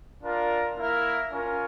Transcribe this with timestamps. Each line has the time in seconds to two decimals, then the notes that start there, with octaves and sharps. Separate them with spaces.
0.23 D4 F4 A#4
0.77 A#3 E4 A#4 E5
1.31 C#4 F4 A#4